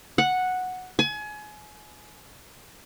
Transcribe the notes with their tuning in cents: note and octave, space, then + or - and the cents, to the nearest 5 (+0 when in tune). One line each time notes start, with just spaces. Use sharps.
F#5 -5
G#5 +30